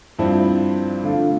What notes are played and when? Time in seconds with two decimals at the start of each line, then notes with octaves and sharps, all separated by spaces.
0.19 G2 F3 C4 E4
1.03 D3 A3 D4 F4 A4